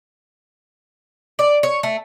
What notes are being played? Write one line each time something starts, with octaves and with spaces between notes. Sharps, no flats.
D5
C#5
A3